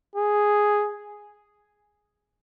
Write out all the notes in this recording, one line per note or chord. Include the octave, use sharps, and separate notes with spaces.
G#4